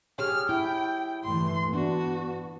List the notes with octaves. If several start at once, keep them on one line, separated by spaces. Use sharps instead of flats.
G4 G#4 C#5 F6
E4 G5
G2 E3 A3 C6
B3 D4 F#4